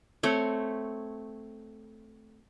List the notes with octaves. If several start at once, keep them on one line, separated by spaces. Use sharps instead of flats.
A3 C4 C#5